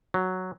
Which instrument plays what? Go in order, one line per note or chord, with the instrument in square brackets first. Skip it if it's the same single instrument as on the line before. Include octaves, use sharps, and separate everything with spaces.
[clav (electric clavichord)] F#3